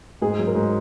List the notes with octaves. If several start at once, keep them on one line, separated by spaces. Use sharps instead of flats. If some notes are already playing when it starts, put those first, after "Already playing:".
G#2 G#4
F#3
A#4
G#2